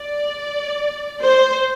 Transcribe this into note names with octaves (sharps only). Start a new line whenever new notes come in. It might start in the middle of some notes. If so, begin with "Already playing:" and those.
Already playing: D5
C5